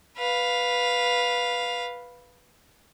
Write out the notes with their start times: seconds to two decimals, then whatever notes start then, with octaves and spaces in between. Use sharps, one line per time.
0.17 B4 F5